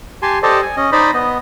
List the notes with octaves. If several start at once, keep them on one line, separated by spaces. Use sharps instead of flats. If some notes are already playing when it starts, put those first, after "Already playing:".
G4 G#5 A5 C6
G4 A4 C5 D5 D#5 A5
G#5
C#4 D#5
D#4 C5 D5 D#5 B5
B3 D#5